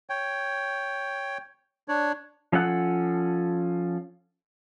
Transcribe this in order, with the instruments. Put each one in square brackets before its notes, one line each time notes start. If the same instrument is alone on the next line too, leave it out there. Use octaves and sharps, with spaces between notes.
[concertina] C#5 G5
D4 C#5
[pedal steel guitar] F3 C#4 A4 F#5 F#6